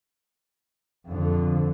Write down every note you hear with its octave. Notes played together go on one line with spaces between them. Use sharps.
F2 D3